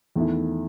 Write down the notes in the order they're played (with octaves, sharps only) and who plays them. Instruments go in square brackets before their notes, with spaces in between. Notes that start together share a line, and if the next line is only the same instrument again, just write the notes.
[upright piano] E2 D#3 A3 E4